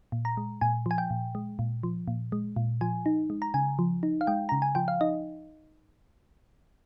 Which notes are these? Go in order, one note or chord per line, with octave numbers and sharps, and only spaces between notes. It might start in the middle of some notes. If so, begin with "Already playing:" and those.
A#2
A#5
G#3
A#2 G#5
F3 G#5
G5
A#2
G#3
A#2
F3
A#2
G#3
A#2
F3 G#5
D#4
G#3
A#5
C#3 G#5
F3
D#4
F5
G#3 G5
C#3 A#5
G#5
F3 G5
F5
D#4 D#5